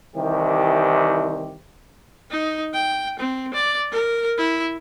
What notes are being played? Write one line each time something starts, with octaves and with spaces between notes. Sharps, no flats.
C2 D#3 E3 G4 C5
D#4
G5
C4
D5
A#4
E4